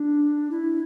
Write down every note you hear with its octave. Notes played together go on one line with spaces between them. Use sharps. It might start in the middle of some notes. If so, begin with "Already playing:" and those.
Already playing: D4
E4